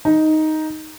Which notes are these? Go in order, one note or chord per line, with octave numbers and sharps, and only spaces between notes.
D#4